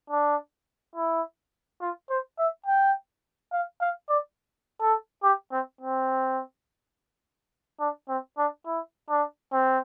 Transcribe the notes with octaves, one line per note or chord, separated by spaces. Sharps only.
D4
E4
F4
C5
E5
G5
F5
F5
D5
A4
G4
C4
C4
D4
C4
D4
E4
D4
C4